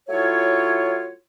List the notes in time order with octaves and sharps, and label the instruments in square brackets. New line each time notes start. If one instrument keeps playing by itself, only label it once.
[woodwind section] F#3 A3 E4 F4 C#5